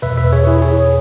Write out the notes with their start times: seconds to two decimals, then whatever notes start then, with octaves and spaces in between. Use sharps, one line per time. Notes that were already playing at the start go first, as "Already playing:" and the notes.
0.02 E2 B2 B4 E5
0.17 B4 E5
0.32 G#4 C#5
0.47 E4 G#4
0.62 G#4 C#5